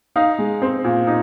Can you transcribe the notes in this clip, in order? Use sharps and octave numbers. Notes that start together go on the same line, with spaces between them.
D#4 F5
G#3
C4
A#2
D#4